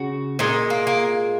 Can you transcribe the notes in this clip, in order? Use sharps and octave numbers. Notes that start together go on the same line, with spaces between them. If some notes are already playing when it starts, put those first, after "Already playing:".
Already playing: C#3 F#4
A#2 G#3 D#4
A#3
A#3